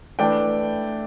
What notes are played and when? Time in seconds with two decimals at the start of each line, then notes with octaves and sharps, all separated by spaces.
0.19 E3 A3 D4 G5